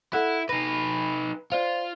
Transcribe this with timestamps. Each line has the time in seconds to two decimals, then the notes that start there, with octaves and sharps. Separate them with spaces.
0.13 E4 A4 F#5 F#6
0.49 D#4 B4 A#6
1.52 F4 C5 D5